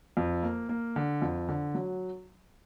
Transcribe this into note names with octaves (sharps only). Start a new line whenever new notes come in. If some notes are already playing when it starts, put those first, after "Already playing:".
F2
A#3
A#3
D3
F2
D3
F#3